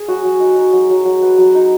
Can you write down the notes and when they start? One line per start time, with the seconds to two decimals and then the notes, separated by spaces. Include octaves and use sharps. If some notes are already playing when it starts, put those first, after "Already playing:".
Already playing: G#4
0.08 F#3 F#4
0.24 F#3
0.40 D#4
0.56 F#3
0.73 F#3
0.90 F#3
1.05 F#3
1.22 B3
1.38 F#3
1.55 D#4